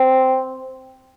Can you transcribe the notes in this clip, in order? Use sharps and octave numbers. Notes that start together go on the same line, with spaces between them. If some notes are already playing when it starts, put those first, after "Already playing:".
Already playing: C4